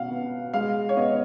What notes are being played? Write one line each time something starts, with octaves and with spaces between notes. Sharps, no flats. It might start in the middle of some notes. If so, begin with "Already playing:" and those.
Already playing: B2 B3 F5 F#5
B3
G#3 F5
C#5
B3 D#5